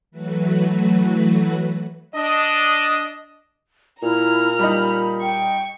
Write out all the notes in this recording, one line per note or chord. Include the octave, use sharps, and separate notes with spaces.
E3 F#3 A3 F#4 B4
D4 D#5
A#2 E4 A#5 F6
G3 D#4 B5
G5 C#6